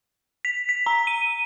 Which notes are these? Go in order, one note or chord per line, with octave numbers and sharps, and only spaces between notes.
B6
B6
A#5
D#7